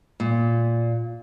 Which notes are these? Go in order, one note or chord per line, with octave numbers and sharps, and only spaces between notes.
A#2